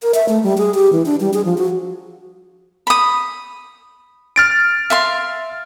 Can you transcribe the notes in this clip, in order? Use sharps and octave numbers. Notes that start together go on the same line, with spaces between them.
A#4
E5
A3
G3
G#4
G4
E3
D4
G3
G#4
F3
F#4
B5 D#6
F6 A6 D7
E5 F5 C6